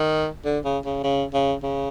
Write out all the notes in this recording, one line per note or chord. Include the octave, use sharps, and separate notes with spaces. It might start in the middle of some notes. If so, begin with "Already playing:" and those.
Already playing: D#3
D3
C#3
C#3
C#3
C#3
C#3